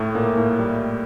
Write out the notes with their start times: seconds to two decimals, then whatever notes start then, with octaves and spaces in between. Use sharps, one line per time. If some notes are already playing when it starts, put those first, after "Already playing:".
Already playing: A2 A3
0.15 A#2 A#3
0.37 A2 A3
0.59 G3